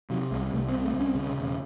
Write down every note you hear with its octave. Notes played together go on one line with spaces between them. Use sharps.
C3 F#3
C2 G#3
C2 A3
C4
C3
A3
C2 C#4
C#3 C#4
E1